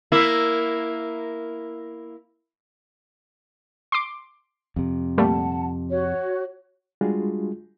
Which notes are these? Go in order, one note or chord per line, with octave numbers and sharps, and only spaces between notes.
A#3 E4
C6 D6
F2 C3
A#2 G3 A3 F#5 A5
F#4 C#5
G3 G#3 D4 F4 F#4 G#4